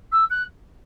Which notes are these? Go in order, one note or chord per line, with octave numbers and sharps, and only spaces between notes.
E6
F#6